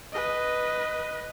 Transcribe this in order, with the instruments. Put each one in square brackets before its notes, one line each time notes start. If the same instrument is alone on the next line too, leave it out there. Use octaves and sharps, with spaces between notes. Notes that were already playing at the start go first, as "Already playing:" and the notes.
[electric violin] B4 D#5